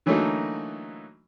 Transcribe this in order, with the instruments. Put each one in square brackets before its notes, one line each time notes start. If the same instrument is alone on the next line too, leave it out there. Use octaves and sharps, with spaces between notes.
[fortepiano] D3 E3 F#3 A3 A#3 D#4